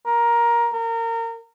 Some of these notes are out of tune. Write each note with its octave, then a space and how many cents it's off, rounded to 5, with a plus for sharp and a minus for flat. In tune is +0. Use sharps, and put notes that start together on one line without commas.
A#4 +15
A#4 -25